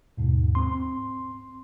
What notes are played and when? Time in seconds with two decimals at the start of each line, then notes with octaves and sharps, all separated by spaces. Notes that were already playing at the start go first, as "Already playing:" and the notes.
0.17 D#2 G#2 B2
0.55 C4 C6